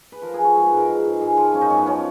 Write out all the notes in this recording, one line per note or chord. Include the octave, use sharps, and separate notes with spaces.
B4
F3 A#4
G#4
F3 F#4
G#2 G#4
B4
G#2 A#4
G#2
G#2
G#2 G#4
F3 F4
F#2 C#4
D#4
F#2 C#4
B3
F3 C#4